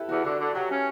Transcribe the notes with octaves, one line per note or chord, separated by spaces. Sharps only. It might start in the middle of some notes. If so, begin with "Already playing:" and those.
Already playing: E4 G4 A4 B4
E2 F#4
D3 F#4
D3
F#3 G4
C#4